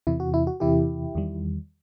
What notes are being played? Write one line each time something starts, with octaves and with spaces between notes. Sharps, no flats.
E2 C3 E3 E4
F#4
E4
F#4
E2 C3 E3 E4 G4
E2 D#3 G3